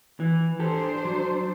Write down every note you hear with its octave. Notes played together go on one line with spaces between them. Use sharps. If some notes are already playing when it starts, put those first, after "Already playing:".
E3
D4 G4 A4 C5
F#3